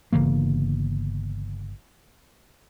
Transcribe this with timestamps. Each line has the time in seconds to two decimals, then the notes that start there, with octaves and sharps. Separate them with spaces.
0.12 G1 C#3 E3 A#3